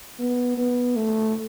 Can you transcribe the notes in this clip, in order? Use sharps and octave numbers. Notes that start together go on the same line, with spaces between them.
B3
B3
A3